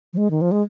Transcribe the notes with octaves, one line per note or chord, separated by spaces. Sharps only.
F3
G#3
D#3
F3
G#3